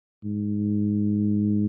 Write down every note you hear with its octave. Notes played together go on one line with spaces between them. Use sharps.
G#2